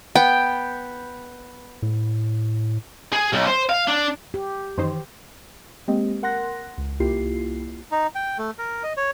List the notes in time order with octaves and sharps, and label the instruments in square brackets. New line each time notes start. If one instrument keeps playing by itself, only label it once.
[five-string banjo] B3 [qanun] G5
[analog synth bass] A2
[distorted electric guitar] G#4
B1
C5
F5
D4
[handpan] G4
[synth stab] F#2 D#4 C5 [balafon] D#3 E3
[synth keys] G#3 A#3 C4 G4 D#5
A#4 F#5 C6 F#6 A#6
C#2
C2 A#3 E4 F4 G4 C7
[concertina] D#4
G5
A3
A#4
D#5
C#5